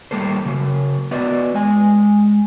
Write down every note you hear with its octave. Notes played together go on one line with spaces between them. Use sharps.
G3 A#3 A4 C5
C#3 F#3
B3 F#4 B4 D5 D#5
G#3 G#5